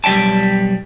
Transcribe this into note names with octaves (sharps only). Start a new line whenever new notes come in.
B1 G3 E5 G5 A5